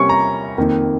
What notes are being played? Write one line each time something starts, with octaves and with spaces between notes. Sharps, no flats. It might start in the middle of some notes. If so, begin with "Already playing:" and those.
Already playing: C3 G3 A#3 C#4 C#6
A#5
F2 D#3 A#3